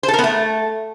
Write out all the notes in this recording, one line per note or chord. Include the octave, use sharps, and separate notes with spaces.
C5
A4
A#4
B3
A3